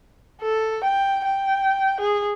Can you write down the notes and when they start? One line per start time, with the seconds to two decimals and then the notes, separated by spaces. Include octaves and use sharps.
0.41 A4
0.84 G5
1.25 G5
2.00 G#4